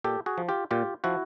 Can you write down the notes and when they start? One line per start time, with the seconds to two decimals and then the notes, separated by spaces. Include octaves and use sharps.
0.04 A#2 G4 A4
0.26 F#4 G#4
0.38 F3
0.49 F4 G4
0.71 A#2 F4 G4
1.04 F3 E4 F#4